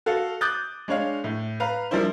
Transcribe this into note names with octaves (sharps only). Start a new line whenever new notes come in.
F#4 A4 F5
D6 D#6 F#6 G6 A6
G#3 D4 C#5 F5
A2
B4 F5 A#5
F3 G3 A#3 D4 E4 C5